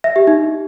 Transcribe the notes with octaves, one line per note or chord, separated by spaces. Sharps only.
E5
G4
D#4